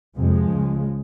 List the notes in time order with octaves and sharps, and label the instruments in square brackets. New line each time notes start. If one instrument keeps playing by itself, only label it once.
[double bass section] F2 C3 F3 G#3
C#2 C#3